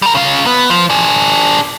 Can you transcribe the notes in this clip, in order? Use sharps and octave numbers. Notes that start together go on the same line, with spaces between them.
G3 A#4
C#3 F4
B3
F3
D4 G#4